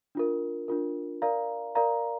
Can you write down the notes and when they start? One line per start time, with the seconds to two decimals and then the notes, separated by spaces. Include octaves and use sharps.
0.15 D4 F4 A#4
0.68 D4 F4 A#4
1.22 A#4 D5 F5 A#5
1.75 A#4 D5 F5 A#5